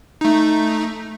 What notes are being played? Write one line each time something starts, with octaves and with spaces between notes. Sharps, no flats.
A3 D#4